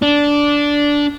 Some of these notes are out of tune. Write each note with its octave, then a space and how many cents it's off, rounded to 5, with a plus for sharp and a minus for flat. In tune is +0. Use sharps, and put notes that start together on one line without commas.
D4 -10